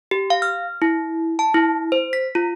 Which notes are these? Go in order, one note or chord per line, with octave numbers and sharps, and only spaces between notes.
G4
F5
F6
E4
A5
E4
C5
B6
F4